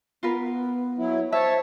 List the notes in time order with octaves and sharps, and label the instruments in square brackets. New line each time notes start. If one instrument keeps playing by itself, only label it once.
[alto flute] B3 [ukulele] F4 A#4 B4
[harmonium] F#3 E4
[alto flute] C5 [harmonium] C#5 A5 [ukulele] E5